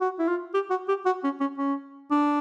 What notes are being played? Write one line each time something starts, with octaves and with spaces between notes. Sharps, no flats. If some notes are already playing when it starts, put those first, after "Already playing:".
F#4
E4
F4
G4
F#4
G4
F#4
C#4
C#4
C#4
D4